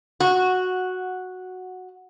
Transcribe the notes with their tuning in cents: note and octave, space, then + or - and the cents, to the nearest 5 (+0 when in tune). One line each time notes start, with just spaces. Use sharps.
F#4 -5